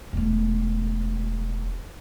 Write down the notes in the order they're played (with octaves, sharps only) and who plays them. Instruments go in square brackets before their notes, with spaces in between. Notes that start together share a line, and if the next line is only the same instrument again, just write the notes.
[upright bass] E1 A3